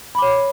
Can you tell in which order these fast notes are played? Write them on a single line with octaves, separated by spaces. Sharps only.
B5 D6 C#5